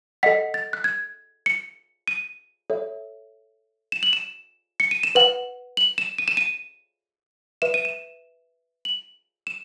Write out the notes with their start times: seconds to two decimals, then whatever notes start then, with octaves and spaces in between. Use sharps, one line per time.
0.23 A4 D#5 F#5 B6
0.54 A6
0.73 F#6
0.84 G#6
1.46 C#7
2.08 D#7
2.70 A4 C#5 E5
3.92 E7
4.03 F#7
4.13 E7
4.80 C#7
4.91 D#7
5.03 E7
5.15 B4 F#5 F#7
5.77 F#7
5.98 E7
6.18 D#7
6.28 E7
6.37 D#7
7.62 B4 E5 E7
7.74 D#7
7.85 E7
8.85 F#7
9.47 E7